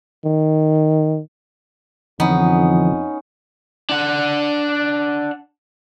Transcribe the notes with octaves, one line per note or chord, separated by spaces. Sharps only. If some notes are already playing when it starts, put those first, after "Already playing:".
D#3
F2 D3 E3 F3 B3 C#4 D#4
D4 F#5